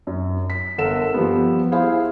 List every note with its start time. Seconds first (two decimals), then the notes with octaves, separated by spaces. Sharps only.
0.07 F#2
0.50 B6
0.78 G1 A4 A#4 F#5 E6 E7
1.14 F3 G3 B3
1.72 E4 G#4 C5 F5